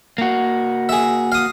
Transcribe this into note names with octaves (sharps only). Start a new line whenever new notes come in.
A#3 F#4
G#4 E5
F5 D#6